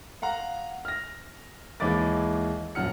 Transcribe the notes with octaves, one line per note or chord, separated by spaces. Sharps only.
F5 F#5 A#5
F6 A#6
D#2 E3 G#3 B5 D6 A6
D#1 F#2 F#5 F6 C#7